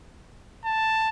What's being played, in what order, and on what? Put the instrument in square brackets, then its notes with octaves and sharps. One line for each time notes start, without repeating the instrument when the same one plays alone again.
[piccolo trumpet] A5